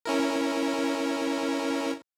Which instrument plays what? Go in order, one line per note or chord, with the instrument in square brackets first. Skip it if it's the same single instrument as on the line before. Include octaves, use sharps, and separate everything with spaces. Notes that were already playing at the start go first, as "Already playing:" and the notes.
[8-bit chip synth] C#4 E4 A#4